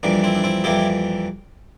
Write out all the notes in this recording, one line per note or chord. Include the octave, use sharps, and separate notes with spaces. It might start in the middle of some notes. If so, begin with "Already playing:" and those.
F2 E3 G3 A#3 D4
C4 E4
D4
C4 E4
F2 E3 G3 A#3 E4 G4